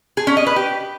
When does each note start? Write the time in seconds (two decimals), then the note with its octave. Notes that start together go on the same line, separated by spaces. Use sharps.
0.17 G#4
0.27 C#4
0.37 D#5
0.46 B4
0.56 G4